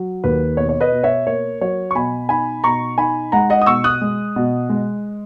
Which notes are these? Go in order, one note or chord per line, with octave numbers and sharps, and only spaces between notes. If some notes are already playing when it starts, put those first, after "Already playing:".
Already playing: F#3
D#2 B4
B2 C#5
C#5
B4 D#5
B2
C#5 E5
A#3 C#5
F#3 C#5
C#6
B2 G#5 B5
D#4 G#5 B5
B2 A#5 C#6
D#4 G#5 B5
G#3 F#5 A#5
D#5 F#5
D#6
B2 C#6 E6
D#6 F#6
G#3
B2
G#3